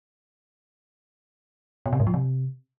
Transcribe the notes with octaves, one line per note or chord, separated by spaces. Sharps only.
B2
C3
G#2
F3
C3